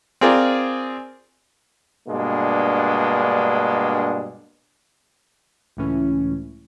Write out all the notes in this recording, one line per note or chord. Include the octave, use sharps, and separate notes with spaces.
C4 F4 G#4 A#4 D5
G2 B2 G#3 A#3 D4
C#2 A2 E3 C#4